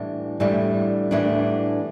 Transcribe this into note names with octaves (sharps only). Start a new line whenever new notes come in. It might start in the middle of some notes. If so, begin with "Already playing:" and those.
Already playing: A2 E3 G3 B3 D4
A2 E3 G3 B3 D4
A2 E3 G3 B3 D4